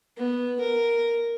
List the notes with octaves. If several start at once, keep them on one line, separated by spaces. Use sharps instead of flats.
B3
A#4